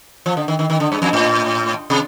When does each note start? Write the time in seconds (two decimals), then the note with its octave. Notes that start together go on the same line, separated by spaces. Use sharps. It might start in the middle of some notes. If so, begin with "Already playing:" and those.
0.26 F3
0.37 D3
0.48 D#3
0.59 D#3
0.70 D#3
0.80 D3
0.92 G2
1.02 F2
1.13 A2
1.90 C3